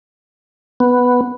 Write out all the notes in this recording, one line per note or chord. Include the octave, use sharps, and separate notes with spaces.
B3